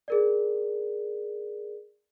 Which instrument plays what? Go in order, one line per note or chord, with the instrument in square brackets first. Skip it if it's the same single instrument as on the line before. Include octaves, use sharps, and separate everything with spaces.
[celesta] G#4 A#4 D5